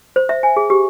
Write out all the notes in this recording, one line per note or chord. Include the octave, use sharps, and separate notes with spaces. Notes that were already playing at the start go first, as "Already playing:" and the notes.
C5
E5
G#5
G#4
G4